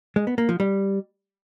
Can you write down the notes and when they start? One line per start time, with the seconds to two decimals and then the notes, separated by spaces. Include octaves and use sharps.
0.16 G#3
0.27 B3
0.38 A#3
0.49 F3
0.60 G3